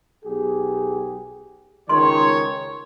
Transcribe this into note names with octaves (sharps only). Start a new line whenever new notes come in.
B1 G4 G#4
C#2 D#3 C#5 C6